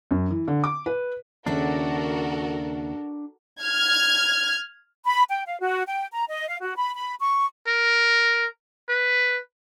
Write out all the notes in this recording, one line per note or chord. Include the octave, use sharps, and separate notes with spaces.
F#2
E3
D3
D6
B4
D#2 C#3 D4 F#4 A4 A#4 E5
F6 G#6
B5
G5
F5
F#4
G5
A#5
D#5
F5
F#4
B5
B5
C#6
A#4
B4